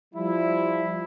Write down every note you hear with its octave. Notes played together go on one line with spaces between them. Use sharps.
F3 G3 E4